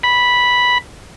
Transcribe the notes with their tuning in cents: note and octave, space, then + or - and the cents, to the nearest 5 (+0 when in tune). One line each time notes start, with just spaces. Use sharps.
B5 -5